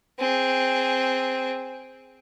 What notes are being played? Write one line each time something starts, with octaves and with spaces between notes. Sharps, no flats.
C4 G#4